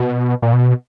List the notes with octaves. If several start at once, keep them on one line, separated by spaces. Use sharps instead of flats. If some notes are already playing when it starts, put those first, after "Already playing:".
Already playing: B2
A#2
B2